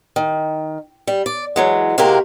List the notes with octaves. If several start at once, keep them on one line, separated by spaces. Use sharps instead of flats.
D#3
G3
D5
E3 F#3 G#3
C3 G#3 A#3 F#4 G4 A#4